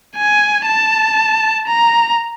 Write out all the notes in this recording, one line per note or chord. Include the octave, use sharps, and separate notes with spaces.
G#5
A5
A#5